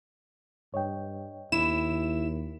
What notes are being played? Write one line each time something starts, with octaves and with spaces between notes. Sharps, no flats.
G2 C#5 D#5 G5
D#2 E4 E7